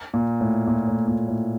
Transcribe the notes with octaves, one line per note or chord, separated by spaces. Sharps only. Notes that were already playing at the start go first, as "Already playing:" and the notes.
A#2
A2
A#2
A2
A#2
A2